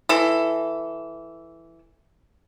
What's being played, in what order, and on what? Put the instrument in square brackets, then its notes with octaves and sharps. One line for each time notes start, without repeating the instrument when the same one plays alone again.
[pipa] E3 A4